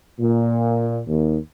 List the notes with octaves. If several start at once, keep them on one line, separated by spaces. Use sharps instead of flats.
A#2
D#2